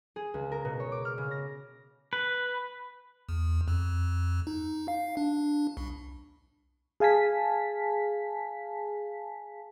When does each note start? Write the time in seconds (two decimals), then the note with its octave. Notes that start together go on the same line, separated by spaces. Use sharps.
0.16 G#4
0.34 C#2
0.52 A#4
0.65 B2
0.80 C#5
0.92 D6
1.05 F6
1.18 C#3
1.31 A#6
2.13 B4
3.29 E2
3.68 F2
4.47 D#4
4.88 F5
5.17 D4
5.77 C2
7.00 G#4 F5 G#5 A5 B6